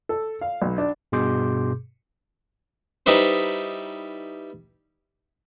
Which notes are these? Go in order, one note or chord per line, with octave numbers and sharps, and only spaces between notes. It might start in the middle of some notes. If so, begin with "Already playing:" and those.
A4
F5
B1
D4
G2 B2 G#4 C6 D6 G6
G3 D#4 E4 B4 C5